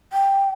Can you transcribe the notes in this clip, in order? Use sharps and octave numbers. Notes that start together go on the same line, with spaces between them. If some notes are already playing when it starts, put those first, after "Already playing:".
G5